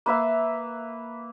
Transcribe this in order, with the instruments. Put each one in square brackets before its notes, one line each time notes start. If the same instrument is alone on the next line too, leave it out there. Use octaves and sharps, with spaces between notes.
[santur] A#3 B4 E5 F5